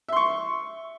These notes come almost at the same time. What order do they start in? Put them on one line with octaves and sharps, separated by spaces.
E5 C6 C#6